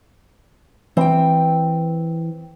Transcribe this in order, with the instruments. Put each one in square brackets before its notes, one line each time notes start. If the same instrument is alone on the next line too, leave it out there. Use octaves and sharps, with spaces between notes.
[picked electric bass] E3 [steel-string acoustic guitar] C4 G5